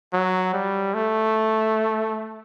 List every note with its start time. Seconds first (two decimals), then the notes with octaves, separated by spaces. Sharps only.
0.13 F#3
0.54 G3
0.94 A3